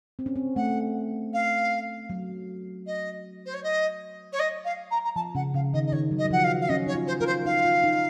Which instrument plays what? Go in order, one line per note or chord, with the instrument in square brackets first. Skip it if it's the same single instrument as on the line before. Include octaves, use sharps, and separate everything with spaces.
[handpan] C4
C#4
C4
[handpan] A3 [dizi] F#5
[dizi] F5
[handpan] F#3
[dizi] D#5
C5
C#5
D#5
C#5
D#5
F5
A#5
A#5
[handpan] F3 [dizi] A5
[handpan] C#3 [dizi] F#5
[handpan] C#3 [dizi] F5
[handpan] D#3 [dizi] D#5
[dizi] D#5
[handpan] D#3 [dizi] C#5
[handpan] F#3
[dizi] D#5
[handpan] F#3
[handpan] F3 [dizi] F#5
[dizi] F5
F5
[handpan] C#4 [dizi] D#5
[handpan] D#4 [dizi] C#5
[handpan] F4
[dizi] C5
[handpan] F4 [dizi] A#4
[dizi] C5
[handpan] D#4 [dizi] F5
[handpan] F4
D#4